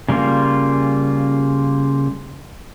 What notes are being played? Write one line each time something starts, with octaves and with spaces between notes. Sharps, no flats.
C#3 G3 A#3 F4